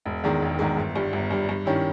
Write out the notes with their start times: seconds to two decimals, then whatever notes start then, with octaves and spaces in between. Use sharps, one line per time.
0.06 E1
0.24 E2 D#3 G#3
0.42 E1
0.59 E2 D#3 G#3
0.77 G1
0.95 G2 G3
1.13 G1
1.30 G2 G3
1.49 G2
1.66 D#3 G3 C#4 E4